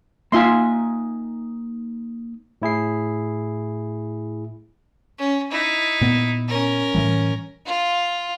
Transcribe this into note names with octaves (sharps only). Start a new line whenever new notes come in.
A#3 D#4 F4 E5 G#5 C6
A2 E4 G#4 C7
C#4
D#4 E4
A#2 B3
C#4 A#4
A2 E3 G3
F4